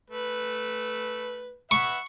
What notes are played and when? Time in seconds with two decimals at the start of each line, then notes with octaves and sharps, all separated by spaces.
0.10 A3 B4
1.71 E5 F#5 B5 C#6